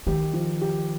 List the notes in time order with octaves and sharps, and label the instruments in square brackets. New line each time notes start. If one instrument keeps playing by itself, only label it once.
[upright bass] D#3 [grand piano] G4
[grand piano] F3
G4